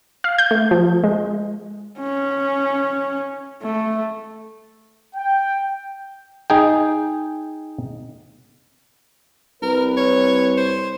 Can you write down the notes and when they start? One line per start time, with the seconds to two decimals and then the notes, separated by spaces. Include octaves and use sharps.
0.24 F5
0.38 G6
0.51 A3
0.71 F3
1.04 G#3
2.00 C#4
3.63 A3
5.15 G5
6.50 D#4 G#4 G5
9.62 C2 A#4 B4
9.97 C#5
10.57 C5